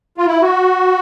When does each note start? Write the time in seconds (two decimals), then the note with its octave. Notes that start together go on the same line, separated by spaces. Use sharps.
0.17 F4
0.26 E4
0.42 F#4